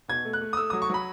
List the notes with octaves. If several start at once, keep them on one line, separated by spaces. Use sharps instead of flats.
B2 G#6
A3
F#6
A3
D#6
A3 E6
F#3 D#6
C#6
F#3 B5